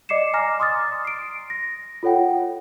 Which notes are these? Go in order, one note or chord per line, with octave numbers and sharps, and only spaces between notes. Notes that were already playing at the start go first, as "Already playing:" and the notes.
D5 D#5 D6 C7 C#7 E7
G#5 A#5 D6 F6 A#6
C6 D6 D#6 F6 A6
C7 D7
A#6
F4 A4 C#5 F#5 G5